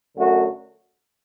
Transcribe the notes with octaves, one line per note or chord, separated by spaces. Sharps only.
F#2 D3 F#3 A3 F#4